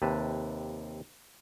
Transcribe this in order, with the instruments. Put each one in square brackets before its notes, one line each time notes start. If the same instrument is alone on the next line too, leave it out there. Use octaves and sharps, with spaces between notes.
[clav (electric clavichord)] D#2 C3 B4 A5